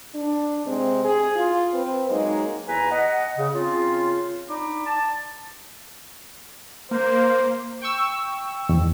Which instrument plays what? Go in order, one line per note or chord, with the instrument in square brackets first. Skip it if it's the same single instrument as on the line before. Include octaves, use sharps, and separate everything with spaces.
[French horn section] D4
C3 G#3 C4
G#4
F4
C4 B4
F#3 G#3 A#3 D#4
[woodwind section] E2 B4 G#5 A#5
D#5 F#5
C#3
C#3 C4 F4
D4 D#4 B5 D6
A5
[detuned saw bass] A#3 [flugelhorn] C5
[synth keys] G5 C#6 E6
[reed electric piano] E2